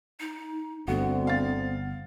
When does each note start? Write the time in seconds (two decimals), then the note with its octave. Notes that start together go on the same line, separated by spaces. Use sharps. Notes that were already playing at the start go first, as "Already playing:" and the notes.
0.20 D#4
0.88 G1 D2 D3 B3 C4 F#4
1.27 F5 A6